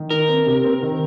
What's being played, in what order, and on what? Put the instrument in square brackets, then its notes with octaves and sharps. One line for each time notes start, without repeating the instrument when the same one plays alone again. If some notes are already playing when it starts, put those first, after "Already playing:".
Already playing: [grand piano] D#3
[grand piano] D#4 [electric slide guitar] A#4
[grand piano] C4
C3
C4
D#3